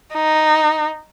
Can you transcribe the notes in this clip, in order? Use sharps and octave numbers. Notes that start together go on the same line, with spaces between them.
D#4